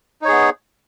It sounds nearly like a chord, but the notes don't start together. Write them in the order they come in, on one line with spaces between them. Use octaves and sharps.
D#4 C#5 G#4 B3